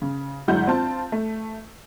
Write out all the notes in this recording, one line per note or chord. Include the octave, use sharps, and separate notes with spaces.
C#3
G1 F#3 G#3 E4 F#5 G6
C4 F4 A5
A3